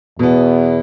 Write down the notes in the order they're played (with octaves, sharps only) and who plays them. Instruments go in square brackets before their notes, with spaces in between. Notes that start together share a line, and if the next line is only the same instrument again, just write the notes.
[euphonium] E2 [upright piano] B2 B3